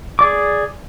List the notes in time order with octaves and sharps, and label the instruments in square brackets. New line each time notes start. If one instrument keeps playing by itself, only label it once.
[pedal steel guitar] G#4 D5 D6